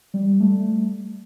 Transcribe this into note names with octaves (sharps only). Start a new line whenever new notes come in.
G3
A3